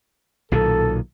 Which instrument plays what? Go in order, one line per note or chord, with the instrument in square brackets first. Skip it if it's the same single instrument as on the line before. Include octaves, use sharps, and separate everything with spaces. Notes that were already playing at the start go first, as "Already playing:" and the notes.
[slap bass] B1 A#2 D#3 [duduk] A4